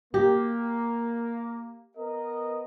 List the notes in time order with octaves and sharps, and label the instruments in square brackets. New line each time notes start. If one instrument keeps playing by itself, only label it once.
[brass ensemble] A#3 [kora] G4
[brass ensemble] B3 A#4 D#5